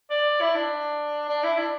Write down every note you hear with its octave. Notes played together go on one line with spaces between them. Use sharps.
D5
E4
D4
D4
E4
D4